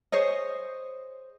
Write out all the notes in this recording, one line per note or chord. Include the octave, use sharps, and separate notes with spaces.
G#4 C5 C#5 D#5